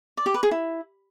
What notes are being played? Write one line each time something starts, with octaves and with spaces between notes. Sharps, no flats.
D5
G4
B4
G#4
E4